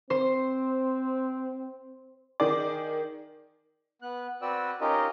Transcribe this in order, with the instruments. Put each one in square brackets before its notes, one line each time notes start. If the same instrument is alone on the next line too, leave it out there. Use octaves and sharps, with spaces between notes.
[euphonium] C4 [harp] C5 C6
[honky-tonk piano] D#3 G#4 D5
[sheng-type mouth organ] B3 F#6
C4 F#4 B4 D5 G5 E6
C#4 D#4 F4 G4 A#4 D#5